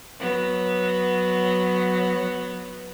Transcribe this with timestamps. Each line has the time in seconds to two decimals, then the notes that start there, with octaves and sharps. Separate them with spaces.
0.18 F#3 B3